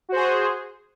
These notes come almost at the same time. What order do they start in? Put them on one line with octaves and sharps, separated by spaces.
F#4 C5 G#4